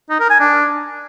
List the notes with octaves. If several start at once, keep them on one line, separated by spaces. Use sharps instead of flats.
D#4
A#4
G#5
D4